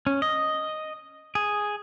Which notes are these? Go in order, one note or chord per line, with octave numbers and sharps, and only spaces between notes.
C#4
D#5
G#4